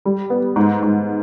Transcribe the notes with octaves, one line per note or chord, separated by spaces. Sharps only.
G3
B3
G#2
G#2